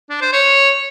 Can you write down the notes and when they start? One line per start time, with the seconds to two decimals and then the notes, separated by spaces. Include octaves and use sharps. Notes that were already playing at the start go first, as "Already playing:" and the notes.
0.10 D4
0.21 C5
0.33 C#5